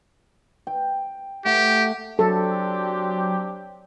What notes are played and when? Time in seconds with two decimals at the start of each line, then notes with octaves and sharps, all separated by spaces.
0.67 G5
1.45 A3 G4 F#5
2.19 F#3 C4 D4 G4 A4